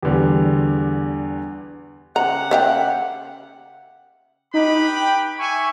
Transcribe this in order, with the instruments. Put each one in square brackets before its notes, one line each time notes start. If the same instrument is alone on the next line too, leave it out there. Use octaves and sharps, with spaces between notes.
[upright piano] E2 D3 G3
[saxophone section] C#3 G4 F#5 [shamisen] A#5
[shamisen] E5 F5 G5
[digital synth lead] D#4 [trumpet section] G4 B4 B5
[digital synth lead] G5
[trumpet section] E5 G#5 [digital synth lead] C#6